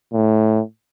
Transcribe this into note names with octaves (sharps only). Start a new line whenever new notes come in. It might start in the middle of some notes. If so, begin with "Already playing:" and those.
A2